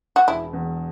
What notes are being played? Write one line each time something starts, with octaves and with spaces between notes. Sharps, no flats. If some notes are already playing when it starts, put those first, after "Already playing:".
F#4
E1 E4
E2